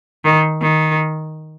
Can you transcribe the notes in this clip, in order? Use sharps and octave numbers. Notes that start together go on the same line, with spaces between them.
D#3
D#3